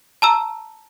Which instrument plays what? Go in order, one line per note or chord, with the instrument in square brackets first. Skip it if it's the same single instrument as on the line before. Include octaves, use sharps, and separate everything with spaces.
[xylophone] A5 A#5 E6